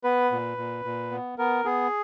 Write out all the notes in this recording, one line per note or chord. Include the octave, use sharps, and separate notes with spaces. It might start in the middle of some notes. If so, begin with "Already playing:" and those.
B3 B4
A#2
A#2
A#2
B3
B3 A#4
B3 G#4